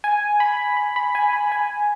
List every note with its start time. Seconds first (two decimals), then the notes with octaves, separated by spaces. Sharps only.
0.04 G#5
0.40 B5
0.77 B5
0.96 B5
1.15 G#5
1.33 B5
1.52 G#5